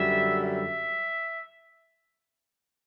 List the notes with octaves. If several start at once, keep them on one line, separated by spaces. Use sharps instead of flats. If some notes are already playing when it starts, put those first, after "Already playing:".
Already playing: F#2 D3 G3 E5
E5